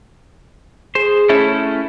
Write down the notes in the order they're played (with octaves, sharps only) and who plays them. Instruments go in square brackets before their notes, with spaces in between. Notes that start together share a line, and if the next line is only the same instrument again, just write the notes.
[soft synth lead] G#4 [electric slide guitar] C5
[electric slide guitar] A3 C#4 E4